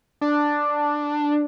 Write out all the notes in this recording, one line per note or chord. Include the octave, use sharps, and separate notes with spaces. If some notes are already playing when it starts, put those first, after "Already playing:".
D4